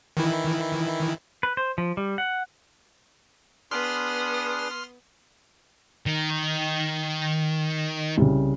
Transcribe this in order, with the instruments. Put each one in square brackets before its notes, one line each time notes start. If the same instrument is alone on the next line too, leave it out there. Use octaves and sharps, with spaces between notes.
[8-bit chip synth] D#3 E3 E4
[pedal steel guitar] B4
C5
F3
G3
F#5
[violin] B3 D#6 [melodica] D4 G#4 B4 [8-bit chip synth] C6 F6
[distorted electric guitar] D#3
[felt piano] C2 C#3